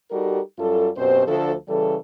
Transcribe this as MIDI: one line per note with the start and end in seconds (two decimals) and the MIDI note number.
0.11 0.40 55
0.11 0.40 63
0.11 0.40 66
0.11 0.40 67
0.11 0.40 69
0.11 0.40 70
0.58 0.89 42
0.58 0.89 55
0.58 0.89 65
0.58 0.89 69
0.96 1.24 42
0.96 1.24 47
0.96 1.24 60
0.96 1.24 67
0.96 1.24 72
1.27 1.54 38
1.27 1.54 53
1.27 1.54 69
1.68 1.96 49
1.68 1.96 52
1.68 1.96 55
1.68 1.96 69